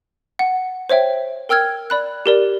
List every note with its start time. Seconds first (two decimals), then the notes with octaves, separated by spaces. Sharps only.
0.39 F#5
0.89 C5 C#5 E5 G5
1.49 A#4 G5 E6 F6 G#6
1.90 D5 B5 F#6
2.26 G4 A#4 D5